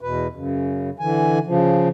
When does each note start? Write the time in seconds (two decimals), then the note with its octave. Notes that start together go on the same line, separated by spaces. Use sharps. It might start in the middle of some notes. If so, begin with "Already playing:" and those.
0.01 E2 B2 B4
0.35 F#2 C#3
1.00 D3 E3 G#5
1.47 C#3 F3